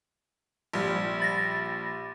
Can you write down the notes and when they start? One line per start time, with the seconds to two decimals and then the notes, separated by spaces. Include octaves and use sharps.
0.73 A#1 G3
1.20 B5 A6 A#6